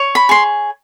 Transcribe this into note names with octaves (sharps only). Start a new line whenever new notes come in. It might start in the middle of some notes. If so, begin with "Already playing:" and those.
Already playing: C#5
B5
G#4 C6